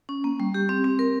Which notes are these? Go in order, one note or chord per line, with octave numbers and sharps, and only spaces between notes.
C#4
A#3
G3
G4
C4
C4
A#4